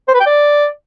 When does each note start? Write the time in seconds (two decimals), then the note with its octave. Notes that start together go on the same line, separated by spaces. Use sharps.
0.08 C5
0.14 B4
0.20 G5
0.26 D5